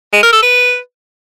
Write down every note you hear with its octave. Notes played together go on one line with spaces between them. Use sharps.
G#3
A#4
A4
B4